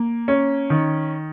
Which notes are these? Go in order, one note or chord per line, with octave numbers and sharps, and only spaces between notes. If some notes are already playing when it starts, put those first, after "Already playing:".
Already playing: A#3
C#4
D#3